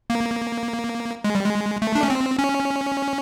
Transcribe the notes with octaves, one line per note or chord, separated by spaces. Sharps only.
A#3
G#3
G3
G#3
A3
D4
C#4
C4
C#4